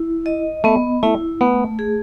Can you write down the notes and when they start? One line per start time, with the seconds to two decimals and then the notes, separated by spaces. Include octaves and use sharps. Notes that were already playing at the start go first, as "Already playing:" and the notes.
Already playing: E4
0.26 D#5
0.64 A3 B3
1.03 A3 E4
1.41 A3 B3
1.79 G#4